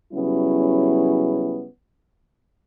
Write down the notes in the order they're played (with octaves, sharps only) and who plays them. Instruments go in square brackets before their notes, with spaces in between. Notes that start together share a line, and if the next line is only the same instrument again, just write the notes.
[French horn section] C#3 F#3 G3 B3 C#4 E4